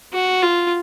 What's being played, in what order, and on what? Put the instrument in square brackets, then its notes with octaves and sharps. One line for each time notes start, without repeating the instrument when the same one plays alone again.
[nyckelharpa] F#4
F4